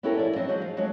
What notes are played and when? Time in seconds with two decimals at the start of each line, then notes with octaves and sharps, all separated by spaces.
0.03 B3 C#4 E4 G4 A4 A#4
0.18 F3 E4 D5
0.36 F#3 C4 D4 D#5
0.48 F3 F#3 G#3 F#4 C5
0.62 F3 F5
0.77 F#3 G#3 A3 D4 F#4